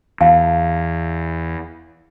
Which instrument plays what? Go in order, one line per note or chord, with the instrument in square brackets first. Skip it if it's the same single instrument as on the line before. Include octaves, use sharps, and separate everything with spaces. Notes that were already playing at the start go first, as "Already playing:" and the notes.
[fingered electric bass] E2 [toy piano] F5 A5